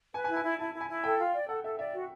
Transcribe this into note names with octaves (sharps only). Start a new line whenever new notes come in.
B4 G#5
G#5
E4
G#5
E4
E4 A5
E4
G#5
E4
A4 G5
F4
D5
A4 F#5
A4 E5
D5 E5
F#4